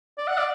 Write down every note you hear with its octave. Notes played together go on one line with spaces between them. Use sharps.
D5
F#5
D5